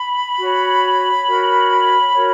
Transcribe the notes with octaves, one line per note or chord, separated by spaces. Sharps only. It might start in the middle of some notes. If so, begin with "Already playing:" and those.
Already playing: B5
F#4 C#5
F#4 A#4 C#5
F#4 A#4 C#5